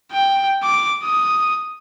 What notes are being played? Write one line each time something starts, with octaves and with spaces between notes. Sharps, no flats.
G5
D6
D#6